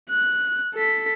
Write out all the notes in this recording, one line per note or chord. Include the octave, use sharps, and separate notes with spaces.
F#6
A4 B6